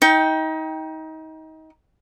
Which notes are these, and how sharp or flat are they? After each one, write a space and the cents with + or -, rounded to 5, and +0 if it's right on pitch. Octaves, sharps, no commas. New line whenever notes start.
D#4 +30 G5 +0